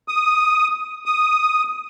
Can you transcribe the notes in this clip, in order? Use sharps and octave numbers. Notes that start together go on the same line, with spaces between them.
D#6
D#6